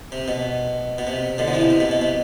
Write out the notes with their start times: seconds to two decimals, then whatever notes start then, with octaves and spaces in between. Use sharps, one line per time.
0.12 C3
0.28 B2
0.98 B2
1.07 C3
1.38 B2 D3
1.48 F3
1.54 C3 E3
1.70 C3
1.80 B2
1.91 B2
2.02 C3